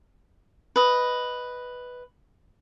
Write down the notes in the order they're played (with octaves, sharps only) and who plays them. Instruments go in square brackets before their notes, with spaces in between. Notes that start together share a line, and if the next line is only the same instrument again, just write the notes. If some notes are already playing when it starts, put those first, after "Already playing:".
[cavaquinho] B4 D#5